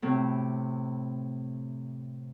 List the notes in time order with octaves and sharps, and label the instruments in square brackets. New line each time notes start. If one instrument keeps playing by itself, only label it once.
[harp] A2 C3